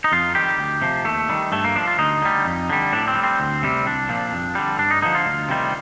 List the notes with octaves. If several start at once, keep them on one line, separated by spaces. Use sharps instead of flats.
D#4
F2 F4
D#3 G3 G4
D2
C3 F3
D#2 A3
D#3 G3
G2 A3
A#3
F3 D4
F4
D2 D#4
D3 G3
F2
D3 G3
A2 D4
C4
G3
C4
D2
C3 G3
C2 D4
A#2 F3
F2
D3 G3
G2 D4
D#4
D3 F3 D#4
F4
D2
C3 D#3 G3